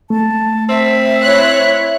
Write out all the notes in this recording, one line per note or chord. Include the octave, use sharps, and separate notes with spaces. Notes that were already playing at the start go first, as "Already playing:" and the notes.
A3 A5
C4 E5
E4 C#5 F#6